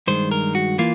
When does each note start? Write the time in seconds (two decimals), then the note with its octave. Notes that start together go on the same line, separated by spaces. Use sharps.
0.07 G2 D#3 G#3 C5
0.31 A#4
0.55 F#4
0.78 E3 A#3 F4